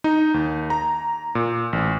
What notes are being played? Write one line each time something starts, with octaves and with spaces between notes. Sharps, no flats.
D#4
D#2
A#5
A#2
A1